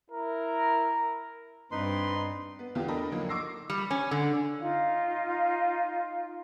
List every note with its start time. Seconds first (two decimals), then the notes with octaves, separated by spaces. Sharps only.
0.11 E4 A#4
1.71 G2 C4 D#4 B4 C6
2.59 B3
2.75 E2 D3 E3 F4 G4
2.88 D4 A4 A#4 D#5 G5 B5
3.12 D3 F3 F#3 A#3 D#4
3.29 C#6 D6 E6 A#6 C7
3.70 G3
3.91 C#4
4.11 D3
4.60 D#4 F4 F5